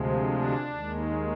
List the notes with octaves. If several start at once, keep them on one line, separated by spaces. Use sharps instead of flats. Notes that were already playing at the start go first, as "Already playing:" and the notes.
Already playing: D2 C3 F3 G#3
D4
D#2 D#3 G#3